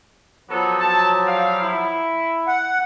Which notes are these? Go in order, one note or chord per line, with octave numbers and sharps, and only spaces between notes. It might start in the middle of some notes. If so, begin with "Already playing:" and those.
F3 F#3 B3 F#4 A4
A5
G3 F5
E4
F#5